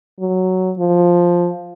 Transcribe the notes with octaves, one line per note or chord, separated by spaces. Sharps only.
F#3
F3